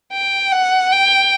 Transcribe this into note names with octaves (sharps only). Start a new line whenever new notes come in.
G5
F#5
G5